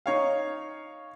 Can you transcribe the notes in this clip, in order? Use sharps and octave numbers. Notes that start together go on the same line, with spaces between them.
D#4 C#5 F5